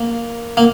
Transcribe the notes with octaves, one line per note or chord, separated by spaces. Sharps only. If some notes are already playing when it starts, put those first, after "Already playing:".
Already playing: A#3
A#3